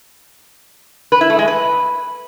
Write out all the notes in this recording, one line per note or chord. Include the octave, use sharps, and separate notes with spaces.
B4
E4
A3
G#3
B4